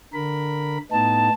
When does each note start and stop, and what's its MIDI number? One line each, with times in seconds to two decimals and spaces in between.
0.13 0.78 50
0.13 0.78 70
0.13 0.78 83
0.91 1.29 45
0.91 1.29 59
0.91 1.29 63
0.91 1.33 81